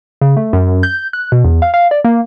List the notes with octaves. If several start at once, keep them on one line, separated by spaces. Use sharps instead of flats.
C#3
A3
F#2
G6
F#6
B2
E2
F5
F5
D5
A#3